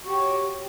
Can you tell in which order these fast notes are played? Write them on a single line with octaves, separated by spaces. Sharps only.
F#4 G4 C#5